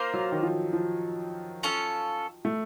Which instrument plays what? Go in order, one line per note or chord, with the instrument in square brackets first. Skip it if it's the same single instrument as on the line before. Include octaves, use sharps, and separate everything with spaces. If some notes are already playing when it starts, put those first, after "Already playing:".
Already playing: [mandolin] A#3 F4 C5
[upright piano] F#3
D#3
F3
F3
[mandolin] C#4 F4 A4
[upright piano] A3